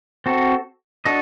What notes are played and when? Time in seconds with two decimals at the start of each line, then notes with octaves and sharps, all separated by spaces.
0.26 C4 F#4 A4
1.05 D4 F#4 A4 D#5